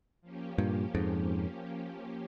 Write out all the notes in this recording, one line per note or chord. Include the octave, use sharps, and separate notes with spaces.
F3 A#3 C#4 G4
G2 A#2
F2 G#2